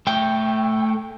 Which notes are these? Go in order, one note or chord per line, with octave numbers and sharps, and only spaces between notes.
A3 G5